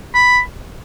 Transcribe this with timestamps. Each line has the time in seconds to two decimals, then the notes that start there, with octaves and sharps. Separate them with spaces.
0.15 B5